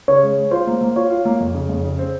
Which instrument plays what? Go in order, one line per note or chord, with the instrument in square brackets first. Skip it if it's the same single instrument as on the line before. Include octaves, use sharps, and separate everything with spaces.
[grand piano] C#3 [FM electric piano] C#5
[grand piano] G#3
G#3
[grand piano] F4 [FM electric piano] C5
[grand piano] A#3
A#3
[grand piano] F4 [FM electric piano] C#5
[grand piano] F4
A#3
F2
C#3
F2
C#3
C4